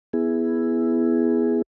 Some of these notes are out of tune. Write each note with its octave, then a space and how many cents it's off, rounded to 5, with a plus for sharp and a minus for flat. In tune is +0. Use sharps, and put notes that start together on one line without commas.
B3 +0 E4 +5 G#4 +0